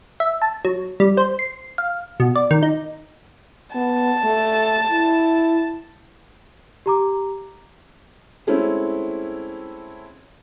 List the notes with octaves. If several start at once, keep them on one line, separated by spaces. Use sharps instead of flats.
E5
A5
F#3
G3
C5
C7
F5
B2
D5
D#3
D#4
B3 A5
A3
E4
G4 A#5 D6
G#3 A3 C4 C#4 E4